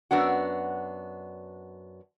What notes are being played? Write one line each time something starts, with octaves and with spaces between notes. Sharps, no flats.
F#2 B3 D4 F#4